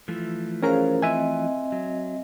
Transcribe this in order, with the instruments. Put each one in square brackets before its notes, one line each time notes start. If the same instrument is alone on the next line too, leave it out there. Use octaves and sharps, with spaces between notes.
[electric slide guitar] E3 F3 A3
[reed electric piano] C#4 A#4 [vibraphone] G#4 C5 F5
[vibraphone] C4 D#5 [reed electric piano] E5 G#5
[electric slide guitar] F#3